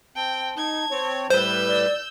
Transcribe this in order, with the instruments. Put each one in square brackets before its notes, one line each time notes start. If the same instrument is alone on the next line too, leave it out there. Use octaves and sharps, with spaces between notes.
[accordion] C4 [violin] G5 [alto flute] A5
[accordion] D#4 [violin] G#6
[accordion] C4 C#5
[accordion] A2 G3 B4 [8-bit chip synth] C5 [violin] E6 G6
[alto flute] D5